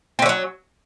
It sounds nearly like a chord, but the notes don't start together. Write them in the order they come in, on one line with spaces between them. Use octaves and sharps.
C4 D3 C#4 F#3